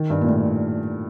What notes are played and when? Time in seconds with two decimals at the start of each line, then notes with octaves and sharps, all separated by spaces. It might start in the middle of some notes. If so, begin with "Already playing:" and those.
Already playing: D#3
0.10 G2
0.21 A#2
0.28 A2